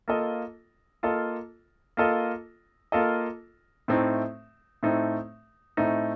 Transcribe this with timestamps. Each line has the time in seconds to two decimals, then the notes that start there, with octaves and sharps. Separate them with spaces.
0.08 A#3 F4 A4 D#5
1.03 A#3 F4 A4 D#5
1.97 A#3 F4 A4 D#5
2.92 A#3 F4 A4 D#5
3.88 A2 A3 C4 D#4
4.83 A2 A3 C4 D#4
5.77 A2 A3 C4 D#4